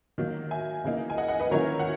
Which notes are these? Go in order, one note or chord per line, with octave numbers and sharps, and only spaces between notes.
D#3 F#3 A#3
E5 G#5
C#3 E3 A#3 D#4
G#5
D#5 F#5
D#5 F#5
B4 D#5
D#3 F#3 A#3 C#4 E4 A#4 C#5
F#5